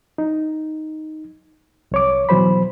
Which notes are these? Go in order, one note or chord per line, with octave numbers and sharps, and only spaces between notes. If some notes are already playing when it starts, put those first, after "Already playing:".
D#4
C2 C#5 D6
B2 E3 F#3 C5 B5